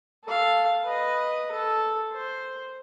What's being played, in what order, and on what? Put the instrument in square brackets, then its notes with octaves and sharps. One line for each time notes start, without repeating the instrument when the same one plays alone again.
[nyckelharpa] A4 F5
B4 D#5
A4
C5